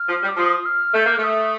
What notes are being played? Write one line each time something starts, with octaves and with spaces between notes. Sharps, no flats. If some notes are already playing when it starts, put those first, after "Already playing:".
Already playing: F6
F3
G3
D6
F3 D#6
F6
A3 G6
A#3
A3 F6
D#6